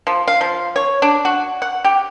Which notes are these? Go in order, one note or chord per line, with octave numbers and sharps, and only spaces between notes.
F3
F5
F3
C#5
D4
F#4
F#5
G4